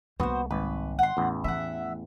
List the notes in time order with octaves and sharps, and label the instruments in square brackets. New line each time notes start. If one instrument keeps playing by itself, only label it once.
[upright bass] C2 A#3 [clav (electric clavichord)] B3 [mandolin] F#4 C5
[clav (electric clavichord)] G#1 [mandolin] B4
[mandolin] F#5 C6
[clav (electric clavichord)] A1 E2
[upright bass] E3 [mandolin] E5 F#5